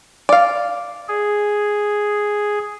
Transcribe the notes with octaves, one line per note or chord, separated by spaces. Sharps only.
D5 F5
G#4